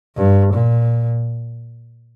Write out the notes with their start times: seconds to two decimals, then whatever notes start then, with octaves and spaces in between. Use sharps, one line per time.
0.16 G2
0.54 A#2